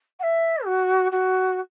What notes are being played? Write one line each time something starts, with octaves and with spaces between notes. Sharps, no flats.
F#5
E5
F#4
F#4